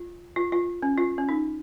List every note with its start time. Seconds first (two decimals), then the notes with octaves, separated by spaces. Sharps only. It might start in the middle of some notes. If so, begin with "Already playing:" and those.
Already playing: F4
0.36 F4
0.52 F4
0.82 C#4
0.98 F4
1.18 C#4
1.29 D#4